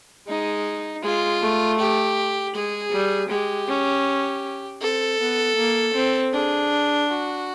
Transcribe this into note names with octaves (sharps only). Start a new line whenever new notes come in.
G#3 D#4
G#3 F4
A3
G4
G#3 G#4
G3
G#3 G4
C#4
C4 A4
B3
A#3
C4
D4 G#4
F#4